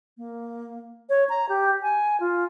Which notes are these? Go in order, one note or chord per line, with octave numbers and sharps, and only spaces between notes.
A#3
C#5
A#5
G4
G#5
F4